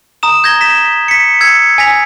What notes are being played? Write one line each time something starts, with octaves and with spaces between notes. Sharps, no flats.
A#5 D#6 E7
G6 G#6 A#6 G7
A#6 B6 E7
B6 C#7
E6 G#6 C#7
G#5 A#6 B6 F7